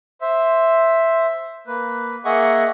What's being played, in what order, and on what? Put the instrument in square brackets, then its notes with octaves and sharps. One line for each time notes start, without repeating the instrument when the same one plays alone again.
[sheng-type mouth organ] C5 E5
A#3 B4
A#3 G#4 D#5 E5 F#5 C#6